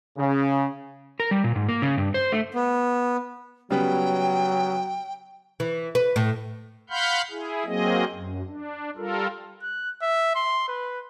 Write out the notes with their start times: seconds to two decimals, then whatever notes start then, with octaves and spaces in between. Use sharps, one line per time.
0.18 C#3
1.20 A#4
1.31 G3
1.44 A#2
1.56 G#2
1.69 A#3
1.82 C#3
1.98 G2
2.14 C5
2.32 A3
2.53 B3
3.71 C#3 F#3 G3 B3 G5
5.60 E3
5.95 B4
6.16 A2
6.90 F5 F#5 B5 C6 F6 G6
7.31 E4 G#4
7.66 F#3 A#3 C4 G#4 D#5
8.12 F#2
8.47 D4
8.97 G3 F4 A4 A#4
9.62 F#6
10.02 E5
10.35 C6
10.68 B4